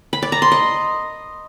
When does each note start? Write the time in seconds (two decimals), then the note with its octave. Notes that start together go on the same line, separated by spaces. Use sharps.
0.13 B5
0.22 D5
0.32 A#5
0.42 C6
0.52 D#5